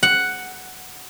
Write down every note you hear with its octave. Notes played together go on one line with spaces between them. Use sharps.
F#5